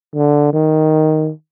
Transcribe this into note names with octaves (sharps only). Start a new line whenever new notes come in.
D3
D#3